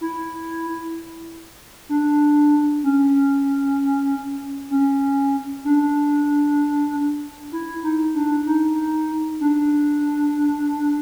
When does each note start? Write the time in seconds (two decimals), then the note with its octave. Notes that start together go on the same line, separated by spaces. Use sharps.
0.01 E4
1.89 D4
2.83 C#4
4.70 C#4
5.65 D4
7.52 E4
7.83 D#4
8.15 D4
8.46 D#4
9.40 D4